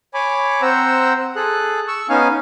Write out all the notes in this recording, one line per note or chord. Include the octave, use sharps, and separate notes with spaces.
C#5 G#5 B5 D6
C4 C5 F#5 A#5 E6
G#4 A4 F#6
C#6 E6
B3 C#4 D#4 F5 G#5